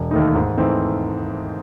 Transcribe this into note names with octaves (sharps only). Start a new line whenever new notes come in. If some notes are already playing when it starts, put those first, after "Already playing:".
Already playing: E1
D#2 D#3 A3 D#4
G#2
E3 A3 C4 D#4